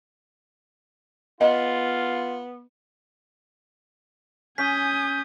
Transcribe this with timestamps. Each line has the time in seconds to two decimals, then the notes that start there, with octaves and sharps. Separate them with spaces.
1.41 B3 F4 D#5
4.58 C#4 G#5 D#6 G6 B6